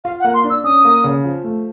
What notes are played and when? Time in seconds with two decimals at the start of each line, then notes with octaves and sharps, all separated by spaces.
0.04 F4 F5
0.20 F#5
0.24 A#3
0.34 C6
0.44 D4
0.50 E6
0.64 C#4 D#6
0.85 A#3
1.04 C#3
1.25 F3
1.44 A3